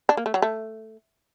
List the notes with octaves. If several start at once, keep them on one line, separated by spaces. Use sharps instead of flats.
D4
A#3
A3
F#3
A3